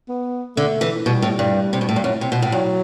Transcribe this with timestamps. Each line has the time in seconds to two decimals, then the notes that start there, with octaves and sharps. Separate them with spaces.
0.09 B3
0.57 D3 A3
0.81 E3
1.06 B2 G3
1.22 A2
1.39 G2
1.73 C3
1.81 B2
1.89 A2
1.96 G2
2.04 F#2
2.21 C3
2.32 B2
2.42 A2
2.52 G2 F#3